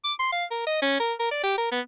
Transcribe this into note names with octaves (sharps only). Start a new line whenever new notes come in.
D6
C6
F5
A#4
D#5
C#4
A#4
A#4
D5
G4
A#4
B3